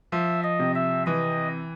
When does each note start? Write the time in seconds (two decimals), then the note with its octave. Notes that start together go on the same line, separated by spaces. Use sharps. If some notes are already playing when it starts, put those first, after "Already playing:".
0.12 F3 E5
0.44 D#5
0.59 C3
0.75 E5
1.06 E3 D#5